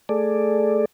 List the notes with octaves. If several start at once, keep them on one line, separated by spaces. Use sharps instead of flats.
A3 G#4 A4 D5